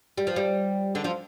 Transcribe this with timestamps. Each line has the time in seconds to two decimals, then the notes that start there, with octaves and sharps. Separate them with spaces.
0.18 G3
0.27 F3
0.36 G3
0.95 D3 D4
1.04 F3 F4